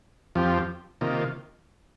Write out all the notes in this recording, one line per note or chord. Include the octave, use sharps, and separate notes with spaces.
F2 F3 C4 G4
C3 D#3 A#3 F4